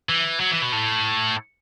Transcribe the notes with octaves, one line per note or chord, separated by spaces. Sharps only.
E3
F#3
E3
B2
A2